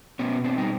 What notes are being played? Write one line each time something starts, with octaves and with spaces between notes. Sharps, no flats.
B2 B3 C#4
C4 D4
G3 D#4